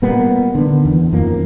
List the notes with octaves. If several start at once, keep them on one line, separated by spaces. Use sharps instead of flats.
A#2 G3 A#3 B3
D3 D#3 B3
E2
F#2 D#3 F3 A#3